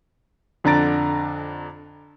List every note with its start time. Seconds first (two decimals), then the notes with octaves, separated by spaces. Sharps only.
0.64 F2 D3 D4 A#5 A6 D7